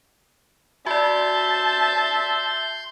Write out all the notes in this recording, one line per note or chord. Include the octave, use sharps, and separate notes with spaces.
F#4 D5 E5 A5 C6 G6